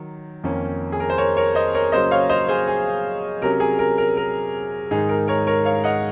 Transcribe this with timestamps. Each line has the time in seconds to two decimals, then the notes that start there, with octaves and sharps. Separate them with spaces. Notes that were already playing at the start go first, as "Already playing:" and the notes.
Already playing: D#3 F#3
0.44 F2 D#3 A#3 C#4
0.92 G#4
1.00 A#4
1.10 C5
1.18 A#4 C#5
1.37 A#4 C#5
1.55 C5 D#5
1.75 A#4 C#5
1.92 C#3 F#3 A#3 C#4 C5 D#5
2.11 C#5 F5
2.29 C5 D#5
2.49 G#4 C5
2.67 G#4
3.41 C3 F#3 C#4 A#4
3.60 G#4
3.79 A#4
3.98 A#4
4.17 A#4
4.91 G#2 D#3 G#3 D#4 G#4
5.09 A#4
5.28 A#4 C#5
5.47 A#4 C#5
5.65 C#5 F5
5.84 D#5 F#5